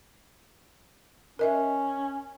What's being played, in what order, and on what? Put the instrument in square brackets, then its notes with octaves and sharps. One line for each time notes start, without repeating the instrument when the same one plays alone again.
[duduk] C#4 [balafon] A#4 D#5 E5